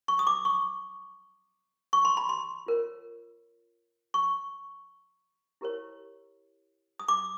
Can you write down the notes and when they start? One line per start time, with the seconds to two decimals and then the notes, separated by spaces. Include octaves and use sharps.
0.08 C#6
0.19 D#6
0.27 D6
0.45 C#6
1.93 C#6
2.05 C6
2.17 B5
2.29 C6
2.66 F4 A#4 C#5
4.14 C#6
5.61 E4 G4 A#4 C#5
6.99 D#6
7.08 D6